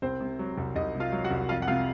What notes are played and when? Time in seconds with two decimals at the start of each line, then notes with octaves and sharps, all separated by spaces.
0.02 C2 C4 C5
0.21 C3
0.39 F#3
0.58 C2
0.75 C2 D#4 D#5
0.94 C3
1.00 F4 F5
1.12 F#3
1.24 F#4 F#5
1.31 C2
1.49 F2 F4 F5
1.62 F#5
1.67 C3 F4 F5